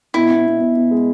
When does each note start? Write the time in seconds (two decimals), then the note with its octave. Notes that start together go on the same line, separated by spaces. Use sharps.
0.14 B2 E4
0.30 B2
0.46 B2
0.60 B2
0.76 B2
0.91 G#3